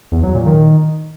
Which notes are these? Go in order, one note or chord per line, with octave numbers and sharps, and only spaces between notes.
E2
F#3
A#2
D#3